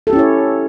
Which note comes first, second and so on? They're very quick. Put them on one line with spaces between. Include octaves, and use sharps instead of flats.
A4 G4 C#4 E4 C#5